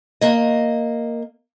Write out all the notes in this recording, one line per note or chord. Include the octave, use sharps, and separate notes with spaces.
A#3 D#5